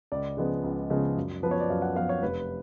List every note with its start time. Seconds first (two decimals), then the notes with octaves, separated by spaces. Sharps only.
0.12 C#2 D5
0.37 C#3 F3 G#3 B3
0.64 C#2
0.90 C#3 F3 G#3 B3
1.17 F#2
1.43 F3 B3 B4
1.51 C#5
1.60 D5
1.70 F#2 F5
1.82 F#5
1.96 F3 B3 F5
2.09 C#5
2.23 F1 B4